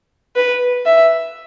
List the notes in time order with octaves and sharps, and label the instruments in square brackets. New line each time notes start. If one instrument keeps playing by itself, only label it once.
[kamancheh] B4
E5